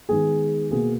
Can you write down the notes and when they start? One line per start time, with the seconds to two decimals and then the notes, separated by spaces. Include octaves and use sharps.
0.09 D#3 G#3 B3 G#4
0.71 B2 A#3 G#4